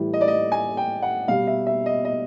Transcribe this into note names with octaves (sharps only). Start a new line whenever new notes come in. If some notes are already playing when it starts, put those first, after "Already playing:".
Already playing: A2 E3 G3
D#5
D5
D#5
G#5
G5
F#5
B2 G3 F5
E5
E5
D#5
D#5